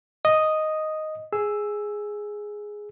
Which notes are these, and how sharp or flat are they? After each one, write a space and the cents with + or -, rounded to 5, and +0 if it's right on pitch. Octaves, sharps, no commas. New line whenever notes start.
D#5 +0 D#6 +0
G#4 +0 E6 +0